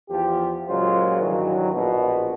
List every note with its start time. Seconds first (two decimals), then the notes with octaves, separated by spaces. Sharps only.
0.10 E2 F3 G4
0.68 A#2 C#3 F#3 G#3 F4 C5
1.21 G2 D#3 E3 F#3
1.73 A#1 B2